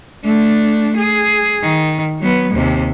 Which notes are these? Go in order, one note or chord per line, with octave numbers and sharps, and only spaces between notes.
A3 D4
G#4
D#3
F#3 B3
D#2 C3